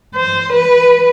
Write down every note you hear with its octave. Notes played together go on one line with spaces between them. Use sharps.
C5
B4